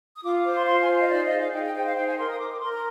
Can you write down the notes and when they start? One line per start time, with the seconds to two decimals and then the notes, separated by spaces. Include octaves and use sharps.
0.16 D#6
0.23 F4 D6
0.44 C5 D6
0.55 C6
0.66 F4 C6
0.80 G#5
0.88 C5
0.99 D#5
1.09 D#4 D5
1.24 D#5
1.31 G#4
1.38 F5
1.52 D#4 G5
1.64 G5
1.74 C5 G5
1.85 F5
1.96 D#4 G5
2.06 G#5
2.18 A#4 C6
2.29 D#6
2.39 A#4 D6
2.50 D6
2.61 A#4 C6
2.72 A#5